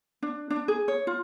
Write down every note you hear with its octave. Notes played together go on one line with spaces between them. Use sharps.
D4
D4
G#4
C#5
F4